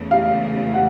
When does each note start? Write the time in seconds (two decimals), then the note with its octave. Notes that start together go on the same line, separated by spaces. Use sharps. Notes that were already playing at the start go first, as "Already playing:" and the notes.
Already playing: E2 C#3 E3 A3
0.11 F5
0.74 F#5